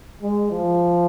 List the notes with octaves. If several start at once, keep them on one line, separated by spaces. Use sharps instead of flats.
G#3
F3